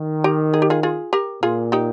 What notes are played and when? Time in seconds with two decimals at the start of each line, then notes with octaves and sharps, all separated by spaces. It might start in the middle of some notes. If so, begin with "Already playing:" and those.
Already playing: D#3
0.24 G4 A#4
0.54 G#4
0.62 G4
0.70 F4 G#4
0.83 F4 G#4
1.13 G4 A#4
1.43 A#2 F4 G#4
1.72 D#4 G4